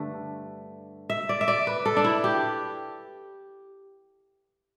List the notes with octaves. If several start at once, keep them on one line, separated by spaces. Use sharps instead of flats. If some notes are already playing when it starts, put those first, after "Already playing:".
Already playing: G2 D3 A3
E5
D5
E5
D5
B4
A4
D4
E4
G4